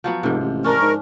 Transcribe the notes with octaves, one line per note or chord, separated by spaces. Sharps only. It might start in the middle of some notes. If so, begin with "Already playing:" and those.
F3 F#3 B3
F1 G#2 C3
A1
C#4 D4 A#4 C#6 F6
G#2